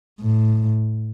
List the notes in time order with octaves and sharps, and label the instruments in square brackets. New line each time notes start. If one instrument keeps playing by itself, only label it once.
[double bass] A2